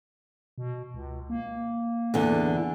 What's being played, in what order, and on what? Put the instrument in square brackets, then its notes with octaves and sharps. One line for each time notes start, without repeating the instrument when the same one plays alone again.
[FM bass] B2
C#2
A#3
[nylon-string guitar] E2 D3